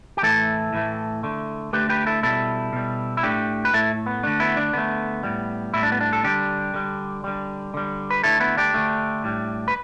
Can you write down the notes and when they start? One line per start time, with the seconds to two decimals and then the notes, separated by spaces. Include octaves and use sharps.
0.17 G4
0.23 A2 E3 A3 E4 A4
0.73 A2 E3 A3
1.23 D3 A3
1.73 D3 A3 G4 B4
1.89 G4 B4
2.06 E4 A4
2.23 B2 G3 E4 A4
2.73 B2 G3
3.17 E4
3.23 A2 A3 D4 G4
3.65 B4
3.73 A2 A3 E4 A4
4.06 B3
4.23 D3 A3 D4
4.40 B3 E4
4.57 D4
4.73 D3 A3 B3
5.23 A2 G3
5.74 A2 G3 E4
5.83 D4
5.92 B3
6.01 D4
6.13 A4
6.24 D3 G3 D4 G4
6.74 D3 G3
7.24 D3 G3
7.74 D3 G3
8.10 B4
8.23 D3 A3 E4 A4
8.40 B3 E4
8.57 D4 G4
8.74 D3 A3
9.24 A2 G3
9.68 B4